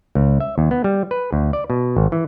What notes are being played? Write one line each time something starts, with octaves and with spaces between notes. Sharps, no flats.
C#2
E5
D#2
B3
G3
B4
D2
D5
B2
G#1
E3